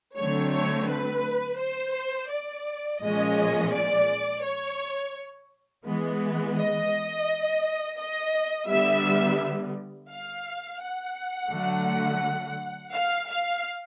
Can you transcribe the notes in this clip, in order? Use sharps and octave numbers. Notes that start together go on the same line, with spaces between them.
D3 F#3 A3 C4 C#5
C#5
B4
C5
D5
A#2 F3 G#3 C#4 D#5
D5
C#5
E3 G#3 B3
D#5
D#5
D3 G3 B3 E5
F5
F#5
D3 F#3 A3
F5
F5